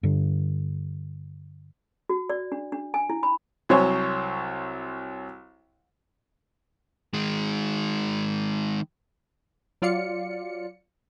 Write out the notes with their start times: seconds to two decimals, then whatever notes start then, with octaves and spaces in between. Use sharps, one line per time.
0.03 G2 D3
2.09 F#4
2.30 D5
2.52 D4
2.72 D4
2.94 G#5
3.10 E4
3.23 B5
3.69 C2 F#3 C5 C#5 G#5
7.14 D#3 G#3
9.82 F#3 F4 D5 F5 C#7